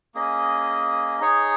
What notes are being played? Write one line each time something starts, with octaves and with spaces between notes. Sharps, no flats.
A#3 C#4 G#4 D#5
D#4 G#4 C#5